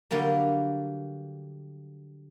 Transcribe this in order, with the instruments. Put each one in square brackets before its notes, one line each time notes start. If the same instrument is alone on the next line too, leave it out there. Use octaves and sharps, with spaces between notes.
[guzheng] D3 F#3 G3 A#3